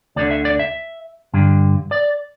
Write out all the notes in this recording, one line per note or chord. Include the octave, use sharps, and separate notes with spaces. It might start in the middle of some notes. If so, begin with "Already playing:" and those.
D2 D3 D5
E5
D5
E5
G2 D3
D5